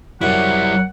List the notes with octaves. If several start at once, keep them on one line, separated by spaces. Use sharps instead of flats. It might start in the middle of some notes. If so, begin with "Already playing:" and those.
F#2 G3 E4 F#5